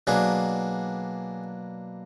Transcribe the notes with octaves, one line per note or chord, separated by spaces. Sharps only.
B2 F#3 A#3 D4 G#4